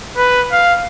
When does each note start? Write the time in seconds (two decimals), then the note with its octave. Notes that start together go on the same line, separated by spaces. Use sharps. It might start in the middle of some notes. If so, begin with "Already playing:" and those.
0.17 B4
0.52 F5